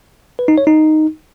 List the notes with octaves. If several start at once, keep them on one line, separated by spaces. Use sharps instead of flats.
B4
D#4
C#5
D#4